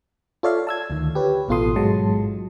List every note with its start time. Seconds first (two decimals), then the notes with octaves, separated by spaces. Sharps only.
0.43 F4 A4 C#5 D5 E5 F5
0.67 A5 E6 G#6
0.90 D2 D#3
1.15 G4 B4 C#5
1.49 A1 B2 F4 A4 C6 D#6
1.76 G#2 F#3 G#3 A5